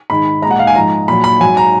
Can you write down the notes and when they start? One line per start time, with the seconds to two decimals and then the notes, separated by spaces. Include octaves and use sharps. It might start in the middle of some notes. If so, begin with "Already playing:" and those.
0.10 G#2 D#3 G#3 B5
0.42 G#3 A#5
0.46 A#2 F#5
0.59 F5
0.67 G#5
0.75 G#2 F3 G#3 A#5
1.08 A#2 F#3 B5
1.24 B5
1.40 G#2 F#3 G#5
1.57 A#5